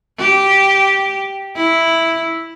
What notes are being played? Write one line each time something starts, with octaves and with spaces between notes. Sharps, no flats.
G4
E4